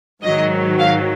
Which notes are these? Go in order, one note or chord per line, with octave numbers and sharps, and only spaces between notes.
G#2 D#3 F#3 D#5
F5